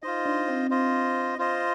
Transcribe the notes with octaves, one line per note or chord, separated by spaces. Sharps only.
D#4 F4 C5 D#5
D4
C4
F4 C5 D#5
F4 C5 D#5